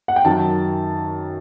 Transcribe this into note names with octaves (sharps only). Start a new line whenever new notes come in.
F#5
G5
F#2 D#3 F#3 A5